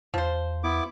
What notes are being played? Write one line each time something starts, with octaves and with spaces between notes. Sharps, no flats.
E2 F3 C5
B3 E4 D6